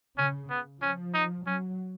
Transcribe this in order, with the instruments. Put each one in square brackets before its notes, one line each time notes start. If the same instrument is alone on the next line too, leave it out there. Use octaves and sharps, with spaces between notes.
[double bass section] C#3 [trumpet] C#4
[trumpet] B3
[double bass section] F3 [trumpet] C#4
[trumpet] D#4
[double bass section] F#3 [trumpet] C#4